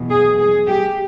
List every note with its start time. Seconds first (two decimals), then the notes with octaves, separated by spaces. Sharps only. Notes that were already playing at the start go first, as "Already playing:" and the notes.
Already playing: E2 B2 F#3
0.10 G#4
0.38 G#4
0.68 G4